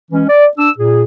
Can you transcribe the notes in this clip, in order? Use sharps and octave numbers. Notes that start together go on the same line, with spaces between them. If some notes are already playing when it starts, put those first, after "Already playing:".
E3 G#3 C#4
D5
D4 E6
A#2 G#4